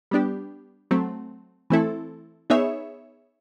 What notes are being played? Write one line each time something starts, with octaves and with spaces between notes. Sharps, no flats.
G3 B3 D4 G4
F#3 A3 C4
E3 A3 C4 E4 A4
B3 D#4 G#4 C#5 E5